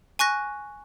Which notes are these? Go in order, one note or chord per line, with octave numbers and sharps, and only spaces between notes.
G#5 C#6 F#6 A#6